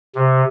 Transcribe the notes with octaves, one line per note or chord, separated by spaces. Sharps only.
C3